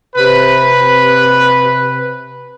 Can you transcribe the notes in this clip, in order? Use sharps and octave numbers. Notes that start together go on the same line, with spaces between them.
C3 B4